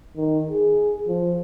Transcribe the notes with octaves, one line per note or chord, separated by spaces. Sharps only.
D#3
G#4
F3